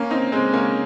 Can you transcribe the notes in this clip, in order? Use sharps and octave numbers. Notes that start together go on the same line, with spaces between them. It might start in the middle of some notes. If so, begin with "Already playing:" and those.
Already playing: A#3 C#4
C4 D#4
G#3 C4
A#3 C#4